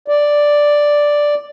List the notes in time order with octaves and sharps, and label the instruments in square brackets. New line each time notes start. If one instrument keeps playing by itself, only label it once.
[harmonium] D5